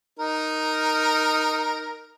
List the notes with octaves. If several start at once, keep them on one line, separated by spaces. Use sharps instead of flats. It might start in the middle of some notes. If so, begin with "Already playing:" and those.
D#4 A#4